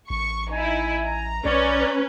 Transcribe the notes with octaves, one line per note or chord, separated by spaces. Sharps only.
A1 C#6
D#4 E4 G#5
A#5
B1 C#4 B4 D5